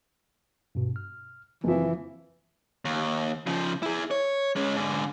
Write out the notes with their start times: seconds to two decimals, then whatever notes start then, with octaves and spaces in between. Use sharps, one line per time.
0.75 G2 B2
0.96 F6
1.64 F#1 E3 F3 C4
2.85 D#2
3.47 C#3 F3
3.83 E4 G#4
4.11 C#5
4.56 G#3 C#4
4.76 G#2 D3